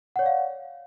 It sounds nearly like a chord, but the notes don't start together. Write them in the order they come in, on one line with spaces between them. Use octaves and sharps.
F#5 C#5 D5 F5